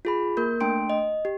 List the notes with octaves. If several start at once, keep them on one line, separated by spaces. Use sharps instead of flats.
F4 G#4 B5
A#3 A#4 G6
A3 D4 G5 C6 D7
D#5
G4